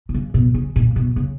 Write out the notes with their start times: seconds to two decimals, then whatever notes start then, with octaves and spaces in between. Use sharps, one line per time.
0.09 B2
0.14 C#3
0.34 B2
0.54 C#3
0.76 A#2
0.96 B2
1.16 C#3